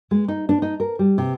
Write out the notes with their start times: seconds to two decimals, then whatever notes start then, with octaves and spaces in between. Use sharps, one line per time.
0.11 G#3
0.28 D#4
0.49 D4
0.62 D#4
0.80 A#4
0.99 G3
1.18 C3